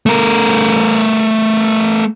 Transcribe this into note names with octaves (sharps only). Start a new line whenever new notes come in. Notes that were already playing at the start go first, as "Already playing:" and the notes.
A3 A#4